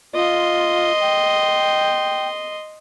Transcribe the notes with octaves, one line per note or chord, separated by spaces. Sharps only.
F4 D#5 C6
G5